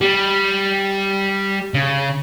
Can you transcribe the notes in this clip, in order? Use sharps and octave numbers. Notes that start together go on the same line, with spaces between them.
G3
C#3